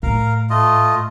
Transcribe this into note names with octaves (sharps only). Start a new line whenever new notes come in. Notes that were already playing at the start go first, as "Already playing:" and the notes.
A2 A#4 F5
A3 F4 D#5